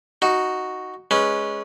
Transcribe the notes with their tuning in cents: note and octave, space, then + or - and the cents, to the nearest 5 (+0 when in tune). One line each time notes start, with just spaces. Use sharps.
D#4 +0 F#4 +0
G#3 +0 C#4 +0 B4 -15